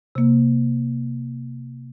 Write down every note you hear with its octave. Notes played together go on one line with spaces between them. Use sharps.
C3 A#3